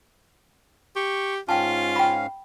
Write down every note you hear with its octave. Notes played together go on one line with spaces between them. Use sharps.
G4 C#6
G#2 C#4 F4 F5 G5 A5
G5 B5